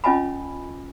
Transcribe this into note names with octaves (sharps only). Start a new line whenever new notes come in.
C#4 F4 D#5 G#5 A5 B5